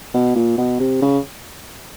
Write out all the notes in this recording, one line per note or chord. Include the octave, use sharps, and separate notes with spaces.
B2
A#2
B2
C3
C#3